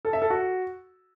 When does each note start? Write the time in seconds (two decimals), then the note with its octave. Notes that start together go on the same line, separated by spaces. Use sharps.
0.05 A4
0.13 E5
0.22 A4
0.30 F#4